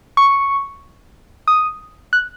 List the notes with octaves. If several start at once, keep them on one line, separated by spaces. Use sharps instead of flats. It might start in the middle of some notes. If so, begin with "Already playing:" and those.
C#6
D#6
F#6